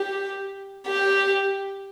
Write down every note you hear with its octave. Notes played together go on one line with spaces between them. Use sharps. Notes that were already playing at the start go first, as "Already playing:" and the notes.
Already playing: G4
G4